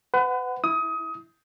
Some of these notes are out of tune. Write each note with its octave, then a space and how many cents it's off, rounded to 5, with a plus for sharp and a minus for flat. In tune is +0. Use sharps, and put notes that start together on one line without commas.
B4 +35 F#5 +5
E4 +0 D#6 +25